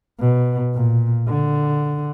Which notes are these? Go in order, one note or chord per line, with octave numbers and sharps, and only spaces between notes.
B2
A#2
D3